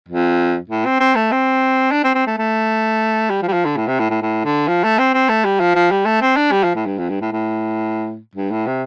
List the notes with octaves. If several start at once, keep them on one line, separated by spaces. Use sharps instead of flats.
F2
A2
C4
C4
A3
C4
D4
C4
C4
A3
A3
G3
F3
G3
F3
D3
A2
C3
A2
A2
A2
D3
F3
A3
C4
C4
A3
G3
F3
F3
G3
A3
C4
D4
G3
F3
A2
G2
F2
G2
A2
A2
G2
A2
C3